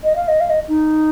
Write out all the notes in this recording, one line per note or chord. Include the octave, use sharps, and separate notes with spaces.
D#5
F5
D#5
F5
D#5
D#4